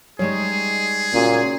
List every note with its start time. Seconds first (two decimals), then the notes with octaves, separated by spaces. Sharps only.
0.19 G3 G#3 D#4 G#4 C#5
1.14 A#2 C#4 F#4